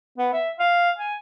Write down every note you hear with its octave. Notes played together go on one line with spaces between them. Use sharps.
B3
E5
F5
G#5